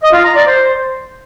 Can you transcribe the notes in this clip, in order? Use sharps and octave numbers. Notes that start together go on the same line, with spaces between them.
D#5
F4
A#5
D5
C5